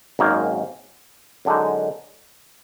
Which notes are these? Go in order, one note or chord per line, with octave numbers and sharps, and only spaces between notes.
G#1 F#2 D#3 A#3
F#2 D3 G#3 D#4